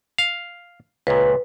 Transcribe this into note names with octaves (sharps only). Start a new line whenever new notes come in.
F5
C#2 A#2 B4